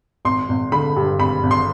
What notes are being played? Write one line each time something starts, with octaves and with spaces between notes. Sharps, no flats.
G#1 C6
G#1
D3 B5
G2
G#1 B5
G#1
C6